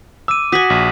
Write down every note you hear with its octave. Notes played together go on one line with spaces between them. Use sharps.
D6 E6 D#7
F#4 G#5 D#6 B6 F#7
A#1